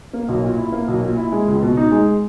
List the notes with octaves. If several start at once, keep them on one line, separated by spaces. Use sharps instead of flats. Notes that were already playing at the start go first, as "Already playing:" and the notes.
A#3
B1
A#2
E4
A#3
B1
A#2
E4
G#3
C#2
B2
D#4
G#3